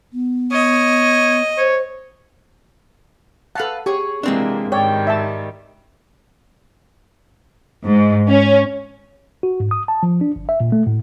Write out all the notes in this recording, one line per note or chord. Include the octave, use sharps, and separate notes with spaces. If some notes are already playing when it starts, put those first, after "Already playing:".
B3
C#5 D#5
C5 C#5
A4 B4 F5 F#5 A5
G4 G#4 C#5 C#6
C3 E3 G#3 A#3 C4 D4
G#2 D#3 G3 C#5 D5 G5
E5 A5
G#2
C#4
F#4
G#2
D#6
A5
F3
D4
G1
E5
A#2
A3
A2